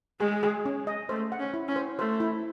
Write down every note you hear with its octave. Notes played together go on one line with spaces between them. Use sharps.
G#3 G#4
G#4
C#4
D#5
A3 C5
F#5
C#4
E4
C#4
C5
A3 C5
E4